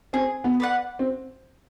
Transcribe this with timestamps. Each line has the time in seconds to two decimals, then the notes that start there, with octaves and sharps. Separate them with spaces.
0.13 C4 G#4
0.44 B3
0.60 B4 D5 F#5
0.99 C4